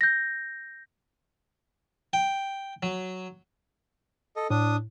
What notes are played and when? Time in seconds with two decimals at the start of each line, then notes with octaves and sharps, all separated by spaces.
0.01 G6 A#6
2.13 G5
2.83 F#3
4.36 A4 D#5
4.50 A2 D4 D#6